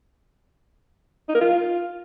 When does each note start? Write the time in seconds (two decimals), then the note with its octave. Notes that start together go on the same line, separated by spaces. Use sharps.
1.29 D#4
1.35 A#4
1.41 F4